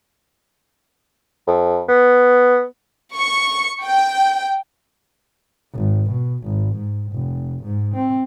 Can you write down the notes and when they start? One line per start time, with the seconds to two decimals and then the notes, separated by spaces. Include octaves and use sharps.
1.47 F2
1.89 B3
3.16 C#6
3.84 G5
5.74 G#1
6.10 B2
6.44 G#1
6.76 G#2
7.13 F1
7.64 G#2
7.95 C4